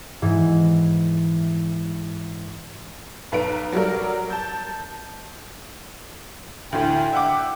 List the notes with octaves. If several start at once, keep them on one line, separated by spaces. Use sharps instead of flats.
G#2 E3
B1 B4 A#5 D7
F#3 G3 F#4 A#4
A5 G6
D2 A2 G5
E5 F#5 D6